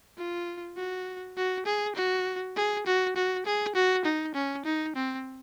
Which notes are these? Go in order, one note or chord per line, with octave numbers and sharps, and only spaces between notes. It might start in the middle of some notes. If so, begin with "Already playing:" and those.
F4
F#4
F#4
G#4
F#4
G#4
F#4
F#4
G#4
F#4
D#4
C#4
D#4
C4